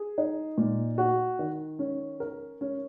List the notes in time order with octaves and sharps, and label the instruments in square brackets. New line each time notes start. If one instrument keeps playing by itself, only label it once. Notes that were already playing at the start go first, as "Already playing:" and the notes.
Already playing: [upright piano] G#4
D#4
A#2
F#4
D#3
C#4
A#4
C#4